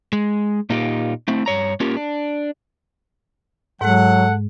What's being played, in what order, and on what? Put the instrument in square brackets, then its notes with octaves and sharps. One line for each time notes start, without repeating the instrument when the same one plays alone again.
[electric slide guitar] G#3
A#2 A#3 D#4 F4 G4
A3 C4 E4
G2 C#5 A#5
A#3 C#4 F4 G4 A#4
D4
[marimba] G#2 G#3 [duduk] F#3 [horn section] A4 F#5